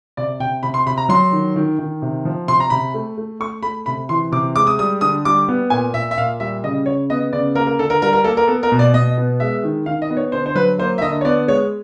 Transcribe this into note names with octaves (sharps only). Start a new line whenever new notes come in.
C3 D5
C3 G5
C3 B5
C6
C3 B5
A#5
F#3 C6
D#3
D#3
D#3
C3
F3
C3 C6
A#5
C3 B5
A3
A3
A3 C#6
A3 B5
C3 B5
E3 C6
C3 D6
G#3 D6
D#6
G3 D#6
D3 D#6
G3 D6
B3
A#2 G#5
A#2 E5
E5
A#2 F5
G3 E5
C#3 D#5
C#3 C#5
B3 D#5
C#3 D5
A#3 A#4
A#4
D3 A4
A#4
G3 A#4
A#4
A#3 A4
A#4
B3 A4
A#4
B2
D5
B2 D#5
B3
G#3 E5
D#3
D#3 F5
D#5
B3
C#5
D3 C5
C5
F#3 B4
A#3 C5
E5
D3 D#5
C#5
B3 D5
G#3 C#5